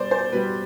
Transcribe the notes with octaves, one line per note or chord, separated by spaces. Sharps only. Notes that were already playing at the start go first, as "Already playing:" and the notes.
Already playing: B2 G3 C5 D5
C5
B2 G3 B4